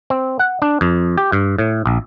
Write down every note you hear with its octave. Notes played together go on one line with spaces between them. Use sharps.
C4
F#5
D4
F2
G4
G2
A2
A#1